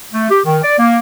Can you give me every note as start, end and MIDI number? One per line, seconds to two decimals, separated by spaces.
0.13 0.25 57
0.30 0.39 67
0.45 0.58 51
0.64 0.77 74
0.79 0.98 58